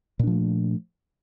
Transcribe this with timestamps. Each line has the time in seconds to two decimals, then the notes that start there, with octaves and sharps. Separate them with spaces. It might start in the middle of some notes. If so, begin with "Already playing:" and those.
0.19 A#2
0.23 D4
0.27 F3
0.31 A3